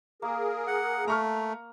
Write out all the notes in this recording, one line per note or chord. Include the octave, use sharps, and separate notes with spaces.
A#3 G#4 A#4
F#5
A3 A#5 C#6 F6